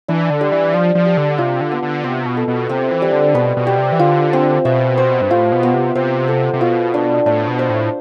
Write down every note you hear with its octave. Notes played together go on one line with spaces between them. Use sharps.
E3 D4
D3
G3
E3
F3 G3
F3
G4
D3
C3 F4
D3
B3
D3
C3 B3
B2
A4
B2
C3 C4
E3
G3
D3
B2 B4
B2
G4
C3
E3
D3 F4
C4
B2 E5
C5
G2
A2 F4
B2
B3
C3
C3 C5
A4
C3
B2 F4
D4
A2 D4
B2
C5
A2